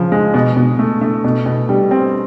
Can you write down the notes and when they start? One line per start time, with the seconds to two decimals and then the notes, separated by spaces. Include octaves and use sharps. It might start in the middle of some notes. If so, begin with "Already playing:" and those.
Already playing: C#3 F3
0.12 G#3
0.34 B2
0.57 B2
0.79 A3
1.01 A3
1.24 B2
1.46 B2
1.69 G3
1.91 C4